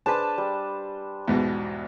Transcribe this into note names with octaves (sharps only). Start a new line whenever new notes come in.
D4 G#4 B4 C5 A5
G3
E2 G#2 B2